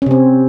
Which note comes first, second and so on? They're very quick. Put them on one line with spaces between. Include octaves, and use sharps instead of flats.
C#4 C3 C4